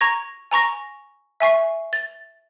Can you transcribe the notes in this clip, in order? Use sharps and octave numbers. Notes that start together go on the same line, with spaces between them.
A#5 C#6 G#6 A#6
G#5 A#5 C#6 A#6
E5 G#5 C#6 C7
A6